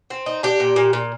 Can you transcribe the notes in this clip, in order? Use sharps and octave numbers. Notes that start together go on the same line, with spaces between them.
C4
D#4
D4 G4
A#2
A#2
A#2